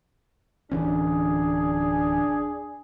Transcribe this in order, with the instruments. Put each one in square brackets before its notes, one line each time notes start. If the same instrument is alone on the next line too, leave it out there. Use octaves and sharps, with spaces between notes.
[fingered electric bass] D1 E3 C#4 [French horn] D4 [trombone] G#4